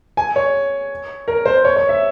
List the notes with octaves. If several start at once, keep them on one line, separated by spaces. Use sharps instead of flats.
G#5
C#5
A#4
C5
C#5
C#5
E5